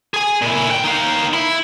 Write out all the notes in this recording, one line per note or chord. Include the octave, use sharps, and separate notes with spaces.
G#4 G#5
A#2 E4
D2 G5
D#4 F5
E4